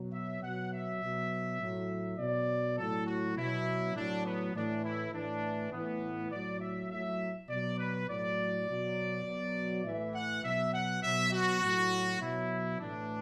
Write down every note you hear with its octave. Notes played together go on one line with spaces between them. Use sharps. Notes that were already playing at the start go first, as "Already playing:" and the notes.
Already playing: B2 F#3
E5
B2 F#3 F#5
E5
B2 F#3
A2 F#3
B2 F#3 D5
A2 F#3 A4
F#4
B2 F#3 E4
A2 F#3 D4
B3
A2 E3 D4
E4
A2 E3 D4
A2 E3 B3
A2 F#3 D5
E5
A2 F#3 E5
B2 F#3 D5
B4
A2 F#3 D5
B2 F#3
B2 F#3
A2 E3 E5
F#5
B2 F#3 E5
F#5
B2 F#3 E5
F#4
A2 F#3
B2 F#3 E4
A2 E3 D4